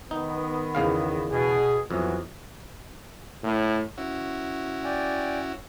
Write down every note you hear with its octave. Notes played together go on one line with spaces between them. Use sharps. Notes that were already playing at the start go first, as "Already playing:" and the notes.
D#3 B3 D#4
E2 C#3 F5
B2 G#4
F2 E3 F#3 B3
A2
C#4 E4 F#4
D5 G5 G#5